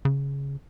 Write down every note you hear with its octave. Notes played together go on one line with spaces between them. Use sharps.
C#3